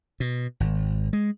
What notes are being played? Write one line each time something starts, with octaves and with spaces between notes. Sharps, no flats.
B2
G#1
G#3